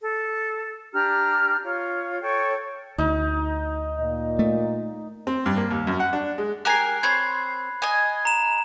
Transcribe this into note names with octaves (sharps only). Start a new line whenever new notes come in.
A4
D4 G4 A#5 F6
F4 C#5
A4 C#5 G5 C#6
D2 D#4
A#2 D#5
A3
C4
G2
A#3
D#2
F#2
F#5
D4
G#3
G4 A#4 G#5 F#6 C7
C4 C5 C#5 B5 G#6
D#5 G#5
A#5 E7